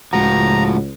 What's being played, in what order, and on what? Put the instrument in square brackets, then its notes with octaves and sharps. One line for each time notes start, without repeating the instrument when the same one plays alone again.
[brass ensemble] C#2 [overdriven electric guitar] A2 F3 [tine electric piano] G#3 F#4 F#5 [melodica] A#5